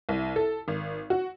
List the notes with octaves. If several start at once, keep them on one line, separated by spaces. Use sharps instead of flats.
C2
A4
G#1
F#4